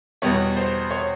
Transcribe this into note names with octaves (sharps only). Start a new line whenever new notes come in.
E2 B2 G3 B3 C#5
C5
C#5